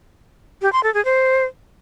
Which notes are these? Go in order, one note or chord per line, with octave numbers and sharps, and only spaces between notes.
G4
C6
A4
G#4
C5